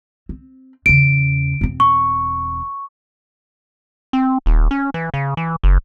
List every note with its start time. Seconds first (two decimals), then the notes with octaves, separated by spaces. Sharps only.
0.29 C4
0.86 E2 C#3 D7
1.61 E1 C4
1.80 C#6
4.13 C4
4.46 D#1
4.71 C#4
4.94 E3
5.14 C#3
5.37 E3
5.63 F#1